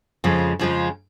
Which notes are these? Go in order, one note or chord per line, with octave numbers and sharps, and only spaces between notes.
F2 C#3 F3 G#3
F2 C#3 F3 G#3